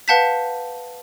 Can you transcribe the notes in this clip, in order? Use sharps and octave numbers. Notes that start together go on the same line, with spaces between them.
B4 F5 F#5 A5 G6 B6